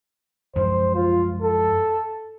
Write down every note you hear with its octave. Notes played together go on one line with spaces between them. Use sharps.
F#2 F3 G#3 C5
F4
A4